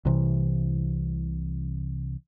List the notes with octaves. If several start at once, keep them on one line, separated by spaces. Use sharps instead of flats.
C2 C3 E3